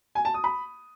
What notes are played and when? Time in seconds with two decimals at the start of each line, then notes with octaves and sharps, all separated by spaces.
0.15 G#5
0.25 A5
0.34 D#6
0.44 B5